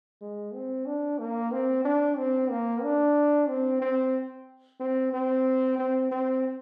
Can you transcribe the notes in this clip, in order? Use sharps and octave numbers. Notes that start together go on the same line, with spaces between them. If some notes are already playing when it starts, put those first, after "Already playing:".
G#3
C4
D4
A#3
C4
D4
C4
A#3
D4
C4
C4
C4
C4
C4
C4